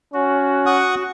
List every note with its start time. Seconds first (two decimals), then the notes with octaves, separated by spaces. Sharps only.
0.14 C#4 F#4
0.66 F#5 C#6 D#6